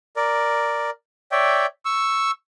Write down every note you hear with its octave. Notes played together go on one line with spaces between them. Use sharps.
A#4 D5
C#5 D5 E5 G5
C#6 E6